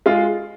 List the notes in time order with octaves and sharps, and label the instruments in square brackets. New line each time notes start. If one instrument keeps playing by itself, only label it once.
[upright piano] G#3 F4